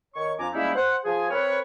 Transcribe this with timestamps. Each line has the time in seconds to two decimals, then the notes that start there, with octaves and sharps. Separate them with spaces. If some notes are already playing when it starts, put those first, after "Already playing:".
0.14 D#3 C#5 C#6
0.38 F2 F3 D4 G#5 A#5 D6
0.53 G3 G#3 A#3 C#4 D#4 E4
0.74 C5 F#5
1.05 F3 G#4 G#5
1.30 C4 A#4 B4 C#5